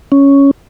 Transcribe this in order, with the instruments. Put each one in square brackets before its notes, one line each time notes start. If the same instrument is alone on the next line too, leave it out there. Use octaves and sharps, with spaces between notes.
[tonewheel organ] C#4